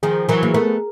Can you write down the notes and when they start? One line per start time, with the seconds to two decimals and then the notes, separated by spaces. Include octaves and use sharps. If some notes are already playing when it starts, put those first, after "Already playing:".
0.03 D#3 F3 G#4
0.29 E3 F#3 A#4
0.43 A#3
0.54 A3 B3 A#4